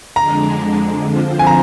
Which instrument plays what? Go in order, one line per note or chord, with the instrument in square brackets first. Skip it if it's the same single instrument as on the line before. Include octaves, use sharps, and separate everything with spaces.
[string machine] F2 D3 G#3 D4 [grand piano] A#5
[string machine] D3 F3 C4 F4 C5
[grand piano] G#5
A#5